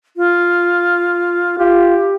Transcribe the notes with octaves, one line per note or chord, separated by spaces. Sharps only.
F4
F4 G4